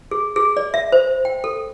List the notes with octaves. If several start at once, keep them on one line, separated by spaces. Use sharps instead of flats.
G#4
G#4
D5
E5
C5
G5
A4